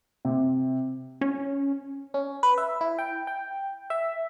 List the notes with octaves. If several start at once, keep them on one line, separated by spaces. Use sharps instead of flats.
C3
C#4
C#4
B4
E5
E4
G5
G5
E5